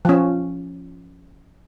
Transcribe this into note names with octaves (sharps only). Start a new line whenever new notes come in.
F3 C#4